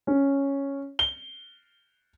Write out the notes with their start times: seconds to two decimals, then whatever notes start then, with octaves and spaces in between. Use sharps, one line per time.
0.07 C#4
0.99 G7